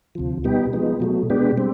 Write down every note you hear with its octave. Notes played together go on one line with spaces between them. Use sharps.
D2 C3 F3
B2 G3 B3 D#4 G4
F3 G#3 B3 D#4
B2 F#3 A3
B2 G#3 B3 D4 G4
G3 C4